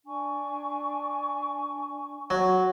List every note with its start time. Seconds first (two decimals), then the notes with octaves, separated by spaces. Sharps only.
0.07 D4 G#5 C#6
2.30 F#3 F#5